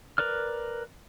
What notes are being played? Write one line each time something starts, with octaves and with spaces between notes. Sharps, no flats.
A#4 B4 D5 F6